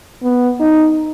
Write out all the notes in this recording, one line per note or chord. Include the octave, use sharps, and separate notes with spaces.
B3
D#4